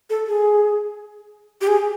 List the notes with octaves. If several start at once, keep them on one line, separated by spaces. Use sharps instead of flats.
A4
G#4
G4
G#4